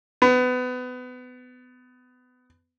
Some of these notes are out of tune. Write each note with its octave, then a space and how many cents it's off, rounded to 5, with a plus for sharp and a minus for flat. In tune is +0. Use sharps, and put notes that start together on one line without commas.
B3 +25